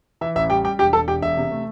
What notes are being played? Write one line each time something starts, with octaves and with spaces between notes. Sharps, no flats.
E3 E5
A1 E5
G3 G4 G5
G3 G4 G5
E1 G4 G5
E1 A4 A5
E1 G4 G5
E1 E5
C3
A3